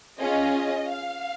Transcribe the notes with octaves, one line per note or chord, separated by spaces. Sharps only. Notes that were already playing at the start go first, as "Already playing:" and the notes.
C#4 F4 G#4 D#5
F5